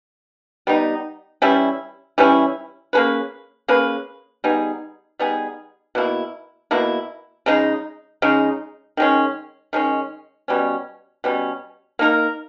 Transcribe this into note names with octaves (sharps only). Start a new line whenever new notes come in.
G3 B3 D#4
E3 G3 C#4 E4
E3 G3 C#4 E4
A#3 C#4 G#4 B4
A#3 C#4 G#4 B4
G3 B3 D#4 G#4
G3 B3 D#4 G#4
B2 A#3 E4
B2 A#3 E4
C#3 G#3 D#4
C#3 G#3 D#4
D#3 G#3 C#4
D#3 G#3 C#4
B2 G3 C#4
B2 G3 C#4
A#3 D#4 A#4